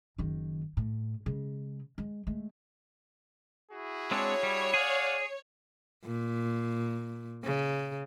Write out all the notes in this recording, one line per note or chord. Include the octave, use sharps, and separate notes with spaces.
F#1 D#3
A2
C#3 G#3
G#3
G#3 A3
E4 F#4 G#4
G#3 C4 D4 C#5
G3
G#4 D5 F5 F#5
A#2
C#3